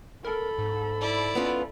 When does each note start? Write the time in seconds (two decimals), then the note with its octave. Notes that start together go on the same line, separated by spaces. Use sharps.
0.24 A4 A#4 B5
0.59 G#2
1.01 E4 D5
1.35 B3 C#4 F4